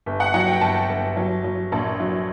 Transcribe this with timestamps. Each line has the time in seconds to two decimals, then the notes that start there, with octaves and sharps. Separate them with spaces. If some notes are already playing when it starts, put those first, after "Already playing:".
0.06 G1
0.20 F#5
0.34 F#3 F#5
0.48 G5
0.61 G1 A5
0.89 G1
1.17 F#3
1.44 F#3
1.72 A#1 A5
2.00 F#3